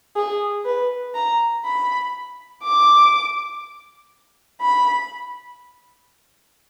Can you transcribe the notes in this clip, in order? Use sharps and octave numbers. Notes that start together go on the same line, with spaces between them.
G#4
B4
A#5
B5
D6
B5